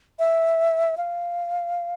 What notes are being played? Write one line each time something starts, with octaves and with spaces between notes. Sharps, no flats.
E5
F5